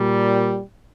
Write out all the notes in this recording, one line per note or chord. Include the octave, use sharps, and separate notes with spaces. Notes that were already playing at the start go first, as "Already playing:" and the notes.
Already playing: A#2 G3